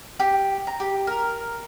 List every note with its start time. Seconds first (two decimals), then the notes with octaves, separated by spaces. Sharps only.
0.19 G4
0.67 A#5
0.80 G4
1.07 A#4